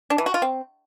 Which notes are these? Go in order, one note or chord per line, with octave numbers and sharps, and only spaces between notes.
D4
E3
F#4
F4
C4